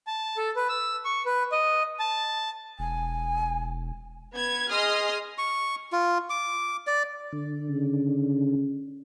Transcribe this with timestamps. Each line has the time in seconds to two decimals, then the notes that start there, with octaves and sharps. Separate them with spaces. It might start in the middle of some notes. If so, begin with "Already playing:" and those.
0.07 A5
0.37 A4
0.56 B4
0.69 E6
1.05 C#6
1.26 B4
1.52 D#5
2.00 A5
2.79 E1 G#5
4.33 B3 G#6
4.70 G#4 D#5 C6 D#6 F6
5.38 C#6
5.92 F4
6.30 D6
6.87 D5
7.32 D3
7.69 C#3